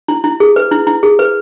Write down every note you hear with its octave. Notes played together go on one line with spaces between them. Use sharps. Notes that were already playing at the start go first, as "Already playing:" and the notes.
E4
E4
G#4
B4
E4
E4
G#4
B4